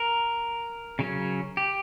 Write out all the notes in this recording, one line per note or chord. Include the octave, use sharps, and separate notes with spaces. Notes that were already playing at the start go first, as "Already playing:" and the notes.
Already playing: A#4
C#3 F#3 C#4
G4